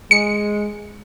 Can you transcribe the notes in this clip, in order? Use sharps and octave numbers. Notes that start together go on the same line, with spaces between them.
G#3 C#7